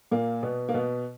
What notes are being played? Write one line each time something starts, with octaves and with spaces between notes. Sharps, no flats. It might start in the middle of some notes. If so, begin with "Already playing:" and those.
A#2 A#3
B2 B3
A#3
B2 B3